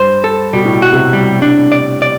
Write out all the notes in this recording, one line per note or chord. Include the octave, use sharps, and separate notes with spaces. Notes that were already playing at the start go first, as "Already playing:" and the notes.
Already playing: G2 C5
A4
B2 G3
A2
B2
F#4
C3
G3
D4
D5
D5